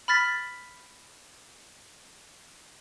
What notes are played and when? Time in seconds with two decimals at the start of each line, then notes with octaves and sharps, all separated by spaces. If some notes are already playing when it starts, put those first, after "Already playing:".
0.08 B5 F6 A6 B6